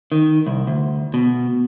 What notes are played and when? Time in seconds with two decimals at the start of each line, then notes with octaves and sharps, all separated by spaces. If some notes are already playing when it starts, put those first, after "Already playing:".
0.12 D#3
0.46 C2
0.67 D2
1.14 B2